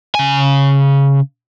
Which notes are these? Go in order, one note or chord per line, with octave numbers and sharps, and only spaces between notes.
C#3 G#5